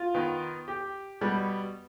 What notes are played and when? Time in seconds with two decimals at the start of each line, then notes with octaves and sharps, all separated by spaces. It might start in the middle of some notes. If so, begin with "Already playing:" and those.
Already playing: F4
0.15 D#3 B3
0.68 G4
1.21 B2 G3 B3